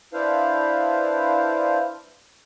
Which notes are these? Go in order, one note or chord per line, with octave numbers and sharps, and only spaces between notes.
D4 E4 B4 C5 F5